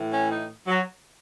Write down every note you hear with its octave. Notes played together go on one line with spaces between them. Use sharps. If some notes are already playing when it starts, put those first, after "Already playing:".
Already playing: A2 E3
C#4
D#4
F#3